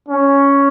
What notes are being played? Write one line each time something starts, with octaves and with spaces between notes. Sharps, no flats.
C#4